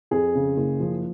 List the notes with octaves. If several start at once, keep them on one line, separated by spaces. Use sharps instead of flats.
F2 G#4
C#3
F#1
F3